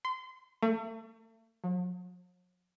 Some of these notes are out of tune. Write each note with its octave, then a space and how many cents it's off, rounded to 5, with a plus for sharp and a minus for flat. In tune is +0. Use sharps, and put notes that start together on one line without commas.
C6 -25
A3 +40
F#3 -45